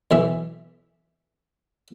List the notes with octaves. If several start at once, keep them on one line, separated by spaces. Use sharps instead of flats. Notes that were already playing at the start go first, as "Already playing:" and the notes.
B1 E3 E5